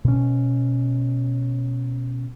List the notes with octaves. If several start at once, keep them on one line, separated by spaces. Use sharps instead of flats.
B2 C#4